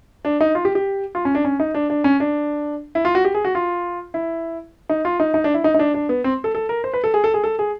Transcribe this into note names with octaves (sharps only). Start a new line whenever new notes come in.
D4
D#4
F4
G4
G4
F4
C#4
D4
C#4
D#4
D4
D4
C#4
D4
E4
F4
F#4
G4
G#4
F#4
F4
E4
D#4
F4
D#4
D#4
D4
E4
D#4
D#4
D4
D4
B3
C4
A4
A4
A#4
C5
B4
A4
G#4
A4
G#4
A4
G#4